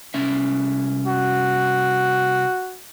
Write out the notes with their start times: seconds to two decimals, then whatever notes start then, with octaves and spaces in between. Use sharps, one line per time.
0.14 C2 C#4 E5
1.07 F#4